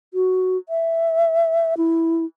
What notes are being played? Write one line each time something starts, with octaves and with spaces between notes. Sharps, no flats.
F#4
E5
E4